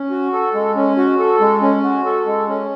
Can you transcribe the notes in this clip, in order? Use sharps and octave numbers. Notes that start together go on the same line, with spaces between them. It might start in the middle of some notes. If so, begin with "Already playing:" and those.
Already playing: C#4
F#4
A4
G#3
C#4
F#4
A4
G#3
C#4
F#4
A4
G#3
C#4